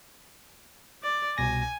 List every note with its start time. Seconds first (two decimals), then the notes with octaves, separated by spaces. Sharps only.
1.03 D5
1.38 C2 B2 G#5 A#6